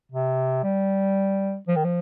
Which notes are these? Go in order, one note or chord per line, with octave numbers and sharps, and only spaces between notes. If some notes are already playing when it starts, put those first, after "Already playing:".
C3
G3
F3
D#3
F3